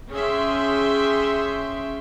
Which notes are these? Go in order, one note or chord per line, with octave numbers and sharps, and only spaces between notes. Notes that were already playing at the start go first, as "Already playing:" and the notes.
C#4 G#4 E5 G5 C6